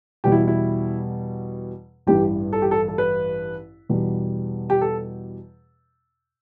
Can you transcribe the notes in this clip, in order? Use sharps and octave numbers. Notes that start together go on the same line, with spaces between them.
E2 B2 G3 G4
E4
E4
A1 G2 E3 G3 G4
A4
G4
A4
A4
B4
E2 B2 G3
G4
A4